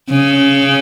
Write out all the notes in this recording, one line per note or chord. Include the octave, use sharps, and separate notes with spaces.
C#3